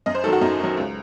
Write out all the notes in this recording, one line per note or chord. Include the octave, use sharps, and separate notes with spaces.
F#2 D#5
C5
D#3 F#3 A4
F#4
F#2 D#4
D#3 F#3
C#2